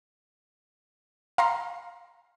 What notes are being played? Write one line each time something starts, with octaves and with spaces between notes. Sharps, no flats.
F5 A#5 C6